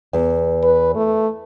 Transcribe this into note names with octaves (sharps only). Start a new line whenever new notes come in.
E2
B4
A3